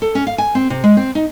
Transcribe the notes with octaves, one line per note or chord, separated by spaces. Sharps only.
A4
C#4
F5
G#5
C4
C3
G#3
C4
D#4